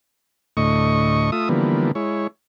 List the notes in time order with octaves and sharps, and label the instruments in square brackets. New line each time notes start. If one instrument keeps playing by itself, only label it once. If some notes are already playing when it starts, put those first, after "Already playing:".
[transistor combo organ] D2 A2 D#5 C#6
A3 F4 E5 D#6
D3 E3 F3 G3 A#3 B3
G#3 E4 C#5